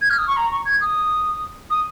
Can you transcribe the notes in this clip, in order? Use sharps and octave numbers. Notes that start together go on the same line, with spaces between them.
G#6
F6
D#6
C#6
A#5
C#6
G#6
D#6
D#6